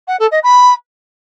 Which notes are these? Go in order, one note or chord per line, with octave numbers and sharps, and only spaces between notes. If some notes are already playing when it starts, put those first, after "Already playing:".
F#5
A4
D#5
B5